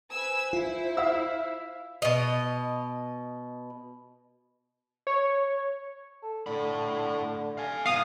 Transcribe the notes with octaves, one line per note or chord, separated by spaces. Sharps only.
B4 C5 G#5 E6
E4 F4
E5 F5 E6
B2 D#5
C#5
A4
A2 D3 B5
F5 G#5
G#2 B3 F5 D#6